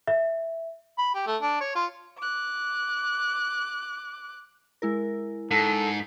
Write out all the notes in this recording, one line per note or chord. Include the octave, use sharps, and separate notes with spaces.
E5
B5
G4
A3
D4
C#5
F4
D6 F#6
G#3 E4 A#4
G#2 A4